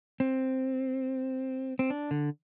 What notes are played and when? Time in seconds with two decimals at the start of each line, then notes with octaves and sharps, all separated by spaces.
0.20 C4
1.79 C4
1.90 D4
2.11 D3